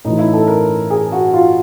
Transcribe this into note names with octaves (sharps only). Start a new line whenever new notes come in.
A2 E3 D#4
E4
A4
A#4
G#4
F#4
F4